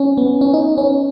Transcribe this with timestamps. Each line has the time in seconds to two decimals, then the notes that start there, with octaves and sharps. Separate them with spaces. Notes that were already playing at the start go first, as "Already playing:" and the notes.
Already playing: C#4
0.17 B3
0.41 C#4
0.54 D#4
0.78 C#4